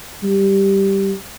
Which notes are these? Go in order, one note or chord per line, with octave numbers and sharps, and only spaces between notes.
G3